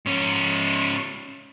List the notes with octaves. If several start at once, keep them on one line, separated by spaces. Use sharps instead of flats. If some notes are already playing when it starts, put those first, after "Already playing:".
G#2 C#4